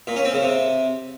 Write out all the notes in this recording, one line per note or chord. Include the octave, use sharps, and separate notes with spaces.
A#2
C#4
C4
C#3
C3